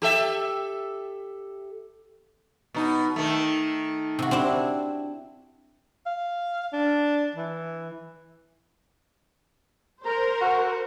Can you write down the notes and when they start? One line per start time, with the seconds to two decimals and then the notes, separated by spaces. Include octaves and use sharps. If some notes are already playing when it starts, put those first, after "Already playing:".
0.02 G4 A4 E5
2.74 B2 D#4
3.16 D#3 A3
4.19 C3 F#4
4.31 C4 D4 E4
6.06 F5
6.73 D4
7.35 E3
10.05 A#4 C5 A#5
10.41 F#4